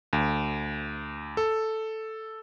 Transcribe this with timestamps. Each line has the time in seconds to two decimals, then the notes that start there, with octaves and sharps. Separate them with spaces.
0.13 D2
1.37 A4